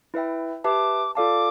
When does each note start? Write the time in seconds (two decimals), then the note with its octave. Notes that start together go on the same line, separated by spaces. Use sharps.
0.14 E4 B4 E5 G5
0.64 G4 B4 E5 A5 D6
1.15 F4 A4 D5 F5 A5 D6